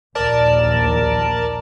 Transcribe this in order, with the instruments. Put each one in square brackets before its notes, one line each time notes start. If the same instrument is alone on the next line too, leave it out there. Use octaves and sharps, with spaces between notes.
[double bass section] A#1 D#2 [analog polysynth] A#4 D5 A5